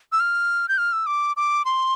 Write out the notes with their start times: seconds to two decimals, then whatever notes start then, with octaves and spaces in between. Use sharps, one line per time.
0.12 E6
0.20 F6
0.69 G6
0.78 F6
0.93 E6
1.06 D6
1.37 D6
1.65 C6